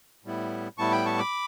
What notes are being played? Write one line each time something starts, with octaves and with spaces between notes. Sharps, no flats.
A2 G3 B3 E4
A2 G3 B3 E4 A5 C#6
G5 B5
A5 C#6
B5 D6